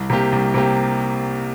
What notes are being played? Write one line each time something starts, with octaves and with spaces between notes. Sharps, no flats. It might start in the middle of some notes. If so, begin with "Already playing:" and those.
Already playing: C2
C3 A#3 G4
C2
C3 A#3 G4